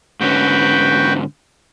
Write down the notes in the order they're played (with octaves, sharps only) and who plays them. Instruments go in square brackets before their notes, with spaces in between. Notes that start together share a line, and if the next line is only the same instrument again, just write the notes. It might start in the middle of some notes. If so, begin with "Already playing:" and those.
[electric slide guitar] G#2 D3 C#4 [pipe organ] F#4 B4 G5